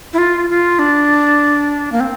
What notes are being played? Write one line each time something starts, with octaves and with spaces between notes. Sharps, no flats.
E4
F4
F4
D4
A#3
C4